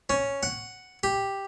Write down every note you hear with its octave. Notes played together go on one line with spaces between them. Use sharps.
C#4
F#5
G4